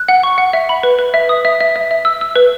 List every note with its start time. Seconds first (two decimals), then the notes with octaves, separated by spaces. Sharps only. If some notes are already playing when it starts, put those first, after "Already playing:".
Already playing: F#6
0.08 F#5
0.23 C#6
0.38 F#5
0.53 E5
0.69 B5
0.83 B4
0.99 B4
1.14 E5
1.29 D#6
1.45 E5
1.60 E5
1.76 E5
1.91 E5
2.05 E6
2.21 E6
2.36 B4